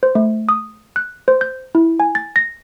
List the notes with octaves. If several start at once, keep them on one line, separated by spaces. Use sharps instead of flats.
C5
A3
D#6
F#6
C5
G6
E4
G#5
A6
A#6